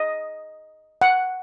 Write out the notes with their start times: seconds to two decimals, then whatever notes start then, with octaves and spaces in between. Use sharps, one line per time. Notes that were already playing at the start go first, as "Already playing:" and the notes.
Already playing: D#5
1.01 F#5